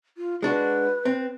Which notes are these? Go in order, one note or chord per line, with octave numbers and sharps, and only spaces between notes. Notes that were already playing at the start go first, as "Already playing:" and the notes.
F4
G#3 D4 F#4 B4
C4